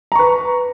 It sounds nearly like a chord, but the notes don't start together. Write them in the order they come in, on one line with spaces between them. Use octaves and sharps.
A#5 C#6 B4